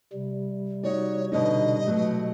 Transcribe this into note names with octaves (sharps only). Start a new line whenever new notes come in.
C3 G3
D#4 F#4 C#5 D5
B2 D3 D#4 D#5
B2 F#3 A3